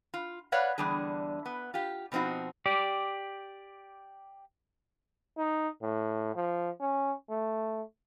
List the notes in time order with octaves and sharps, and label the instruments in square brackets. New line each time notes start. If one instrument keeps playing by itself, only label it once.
[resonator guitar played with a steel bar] F4
B4 C#5 D5 F5 F#5
E2 D3 G3 D4 G#4
B3
F4 G4
B2 F3 C4 D#4 F#4
[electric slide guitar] G4 D5
[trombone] D#4
A2
F3
C#4
A3